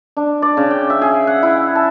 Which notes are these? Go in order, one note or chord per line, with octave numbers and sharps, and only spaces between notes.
D4
D5
C#3
G5
E5
G#4
F#5
E4
A5